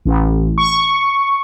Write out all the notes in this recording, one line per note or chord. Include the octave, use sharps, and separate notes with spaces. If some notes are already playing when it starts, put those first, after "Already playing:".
A1
C#6